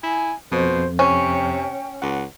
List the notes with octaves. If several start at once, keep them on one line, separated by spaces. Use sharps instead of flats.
E4 G#5
F2 B2 C5
C3 C#4 G5
C#2 F#5